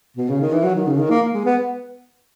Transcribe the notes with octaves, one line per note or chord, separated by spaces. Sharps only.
B2
C#3
D#3
E3
F#3
D#3
C#3
D#3
A#3
G#3
B3